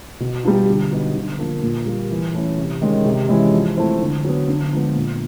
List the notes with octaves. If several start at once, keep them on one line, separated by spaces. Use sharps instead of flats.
B2
G3 B3 D4 F4
D3
F#3 B3 D#4
D3
F3 A#3 D4 F4
A#2
G3 A#3
E3
A3 C#4 E4
C3
D#3 G#3 C#4
C3
E3 G#3 C#4 E4
F3
A3 C4 E4
D3
F#3 B3
D3
F3 G#3 B3
A#2